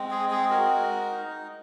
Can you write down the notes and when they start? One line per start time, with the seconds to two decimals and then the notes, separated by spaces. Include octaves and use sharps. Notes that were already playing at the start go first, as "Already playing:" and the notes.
Already playing: G#3 C4
0.11 G#4
0.31 G#3 G#4
0.50 F#4 A#4
0.72 G#3
1.11 D#4